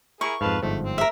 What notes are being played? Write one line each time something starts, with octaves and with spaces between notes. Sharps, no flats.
E4 G#4 A#4 C#6
F2 G#2 B4 F5 A5
G1 G#2 F3 A3
C4
A#4 E5